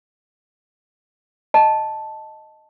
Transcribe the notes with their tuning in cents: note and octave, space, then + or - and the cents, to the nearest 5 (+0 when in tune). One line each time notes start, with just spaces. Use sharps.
D#5 +0 A5 +0